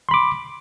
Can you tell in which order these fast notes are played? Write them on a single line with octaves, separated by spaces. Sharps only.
C6 B5 D6